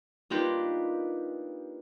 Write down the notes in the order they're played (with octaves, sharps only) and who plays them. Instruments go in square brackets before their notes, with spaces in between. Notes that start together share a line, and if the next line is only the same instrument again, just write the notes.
[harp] A#3 D4 D#4 F4 G4 B4